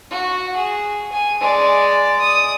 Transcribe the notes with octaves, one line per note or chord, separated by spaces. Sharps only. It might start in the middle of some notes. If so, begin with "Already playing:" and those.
F#4
G#4
G#5
G#3 D5
D#6